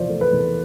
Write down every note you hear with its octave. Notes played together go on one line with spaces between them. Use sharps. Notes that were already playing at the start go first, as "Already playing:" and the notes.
Already playing: E2 C3 F3 C5 D5
A3
B4
E2